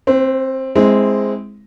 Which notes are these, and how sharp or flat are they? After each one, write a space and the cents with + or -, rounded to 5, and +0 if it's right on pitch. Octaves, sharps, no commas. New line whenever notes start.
C4 +15 C5 -35
G#3 +0 C4 +0 E4 -25